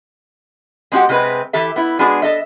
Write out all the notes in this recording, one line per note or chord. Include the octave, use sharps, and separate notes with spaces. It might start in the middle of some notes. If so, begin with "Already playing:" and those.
G#3 C4 C#4 F#4 G4 F#5
C3 G#3 C4 D#4 B4
E3 G4 A4 E5
B3 E4
G#3 B3 D4 F#4 G#4
A4 D#5 E5